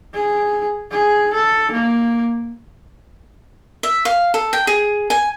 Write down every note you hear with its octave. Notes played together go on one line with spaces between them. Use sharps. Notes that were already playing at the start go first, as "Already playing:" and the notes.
G#4
G#4
A4
A#3
E5
F5
A4
G5
G#4
G#5